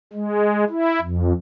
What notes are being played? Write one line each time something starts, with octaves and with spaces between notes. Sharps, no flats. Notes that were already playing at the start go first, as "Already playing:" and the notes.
G#3
E4
F2